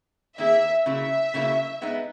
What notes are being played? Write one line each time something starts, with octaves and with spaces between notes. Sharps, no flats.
D#3 A#3 E4 G#4 E5
C#3 F#3 A#3 E4 E5
C#3 F#3 A#3 E4
G#3 B3 D#4